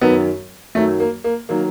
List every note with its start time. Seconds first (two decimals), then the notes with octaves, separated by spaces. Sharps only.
0.01 F#2 D#3 F#3 B3
0.75 F#2 D#3 F#3 A3
1.00 A#3
1.24 A#3
1.49 D#3 F#3 A#3